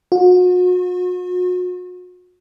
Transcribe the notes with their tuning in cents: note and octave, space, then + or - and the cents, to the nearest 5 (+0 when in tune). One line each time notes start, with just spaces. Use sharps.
F#4 -40